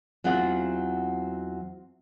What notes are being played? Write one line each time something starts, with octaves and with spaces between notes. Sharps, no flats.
E2 F#3 C4 F4 F#5